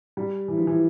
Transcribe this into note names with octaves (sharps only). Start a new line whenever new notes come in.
G3
E3
F3
E3